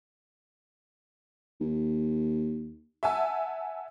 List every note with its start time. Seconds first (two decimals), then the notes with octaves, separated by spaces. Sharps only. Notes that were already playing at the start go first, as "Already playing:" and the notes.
1.61 D#2
3.03 E5 F#5 G#5 A5 E6